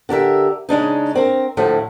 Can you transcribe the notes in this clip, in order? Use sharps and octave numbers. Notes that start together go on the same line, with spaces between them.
D3 G4 A#4 E5
C#3 G#3 D4 D#4
C4 A#4
D2 A2 F3 A3